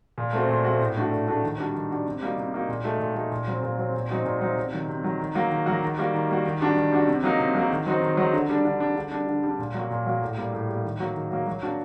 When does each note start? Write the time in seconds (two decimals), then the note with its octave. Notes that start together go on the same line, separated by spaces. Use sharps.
0.18 A#2
0.33 A3 C4 F#4
0.48 A#2
0.64 A3 C4 F#4
0.80 A2
0.96 A3 D4 F#4
1.11 A2
1.28 A3 D4 F#4
1.43 D#3
1.59 G3 D4 F#4
1.74 D#3
1.91 G3 D4 F#4
2.06 C3
2.21 G3 A#3 D#4 F#4
2.37 C3
2.53 G3 A#3 D#4 F#4
2.68 A#2
2.84 A3 D#4 F#4
3.00 A#2
3.15 A3 D#4 F#4
3.31 A#2
3.47 F#3 C4
3.63 A#2
3.78 F#3 C4
3.94 A#2
4.10 F#3 C4 D#4 F#4
4.25 A#2
4.41 F#3 C4 D#4 F#4
4.56 C3
4.73 D#3 F#3
4.88 C3
5.03 D#3 F#3
5.20 D#3
5.35 F#3 A#3 F#4
5.51 D#3
5.66 F#3 A#3 F#4
5.83 D#3
5.98 G3 A#3 F#4
6.14 D#3
6.29 G3 A#3 F#4
6.45 D#3
6.61 G3 D4 F#4
6.76 D#3
6.92 G3 D4 F#4
7.07 C3
7.23 F#3 A#3 D#4 F#4
7.39 C3
7.54 F#3 A#3 D#4 F#4
7.71 D#3
7.86 F#3 C4 D#4 F#4
8.02 D#3
8.17 F#3 C4 D#4 F#4
8.33 D3
8.49 G3 D4
8.65 D3
8.80 G3 D4
8.96 D3
9.12 G3 D4
9.27 D3
9.43 G3 D4
9.59 A#2
9.74 F#3 A#3 F#4
9.90 A#2
10.06 F#3 A#3 F#4
10.21 A2
10.38 G3 A#3
10.53 A2
10.69 G3 A#3
10.84 D#3
11.00 F#3 A#3 F#4
11.15 D#3
11.31 F#3 A#3 F#4
11.47 F#3
11.62 A#3 D4 F#4